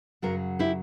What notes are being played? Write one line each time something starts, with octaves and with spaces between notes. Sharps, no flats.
F#2 C#3 F#3 F#4 A#4
E4 G4